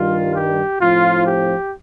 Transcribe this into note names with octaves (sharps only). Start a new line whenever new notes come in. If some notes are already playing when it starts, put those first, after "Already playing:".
Already playing: G2 D#3 G3 F4
G4
A2 F3 C4 F4
G4